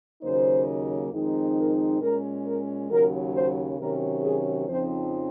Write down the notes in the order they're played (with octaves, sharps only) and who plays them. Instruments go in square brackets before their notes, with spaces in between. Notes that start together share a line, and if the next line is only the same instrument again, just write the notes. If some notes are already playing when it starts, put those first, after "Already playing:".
[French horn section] D#2 C#3 F#3 A#3 D#4 C5
F2 D#3 G#3 C4 D#4
A#4
A#2 G#3 C#4 A#4
A#4
D#2 C#3 F#3 A#4
C5
C3 D#3 F#3 C#4 A#4
G#4
F2 C#3 F3 C4 D#4 C5